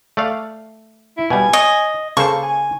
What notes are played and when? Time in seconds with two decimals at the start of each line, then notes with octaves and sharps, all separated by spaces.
0.17 A3 D5 F5
1.17 E4
1.30 B2 G3 G#5
1.53 C#5 D#5
2.17 C#3 A#3 A4 C5 C#6
2.43 G#5